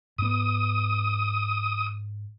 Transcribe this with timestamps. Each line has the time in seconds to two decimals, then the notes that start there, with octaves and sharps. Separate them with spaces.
0.18 G#2 B3 D#6